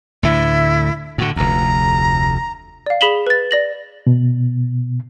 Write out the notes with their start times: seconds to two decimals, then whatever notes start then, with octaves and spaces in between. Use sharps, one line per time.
0.23 D2 A2 D3 E4
1.18 A2 D3 F#4
1.36 F1 D2 A#5
2.86 D5 F5
3.01 G#4 B5 B6 E7 F#7 G7
3.27 B4 A6
3.51 D5 A#6 F#7
4.07 B2